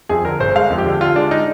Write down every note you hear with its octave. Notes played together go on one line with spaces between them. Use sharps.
F2 G#4
D3 A#4
G1 C5
G#3 F5
F2
G4
D3
D3 F4
G#3 D4
D#4